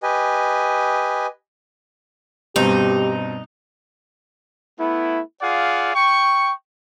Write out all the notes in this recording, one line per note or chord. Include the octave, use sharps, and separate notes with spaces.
G4 B4 D#5 G#5
G2 B2 C4 D#4 G4
A3 B3 E4
F4 G#4 D5 F5 F#5
G5 C#6